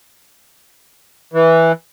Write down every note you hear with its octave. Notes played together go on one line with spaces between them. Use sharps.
E3